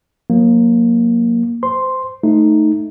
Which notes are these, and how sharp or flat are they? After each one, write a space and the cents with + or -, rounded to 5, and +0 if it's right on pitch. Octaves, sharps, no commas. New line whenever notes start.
F#3 -35 A#3 +0
C5 -20 C6 +0
A3 +0 D#4 +0